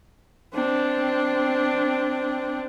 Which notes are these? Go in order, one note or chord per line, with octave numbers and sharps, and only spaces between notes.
C4 D4